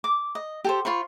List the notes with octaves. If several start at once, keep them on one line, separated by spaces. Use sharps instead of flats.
D6
D#5
G4 A4 C5
F4 C5 B5 C#6